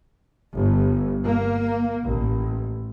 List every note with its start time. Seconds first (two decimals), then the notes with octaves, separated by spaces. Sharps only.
0.54 G1
1.23 A#3
2.05 A1